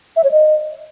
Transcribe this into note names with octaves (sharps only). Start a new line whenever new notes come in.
E5
C#5
D#5